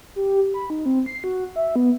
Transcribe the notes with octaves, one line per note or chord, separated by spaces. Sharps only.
G4
B5
D#4
C4
C7
F#4
E5
B3